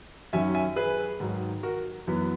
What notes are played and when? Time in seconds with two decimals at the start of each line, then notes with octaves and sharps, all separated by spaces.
0.33 F#2 D#3 F#3 C#4 E5 G#5
0.54 E5 G#5
0.76 G#4 B4
1.20 G#2 D#3 F#3
1.63 F#4 A#4
2.07 F#2 E3 B3